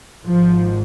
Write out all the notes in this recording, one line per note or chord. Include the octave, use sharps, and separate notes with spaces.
G#1 G#2 F3